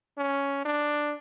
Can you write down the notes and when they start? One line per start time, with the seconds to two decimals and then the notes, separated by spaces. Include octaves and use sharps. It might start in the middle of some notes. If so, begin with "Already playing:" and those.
0.18 C#4
0.65 D4